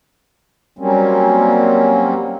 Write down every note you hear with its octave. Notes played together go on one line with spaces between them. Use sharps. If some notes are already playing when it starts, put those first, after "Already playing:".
F#3 G3 A#3 C4 C#4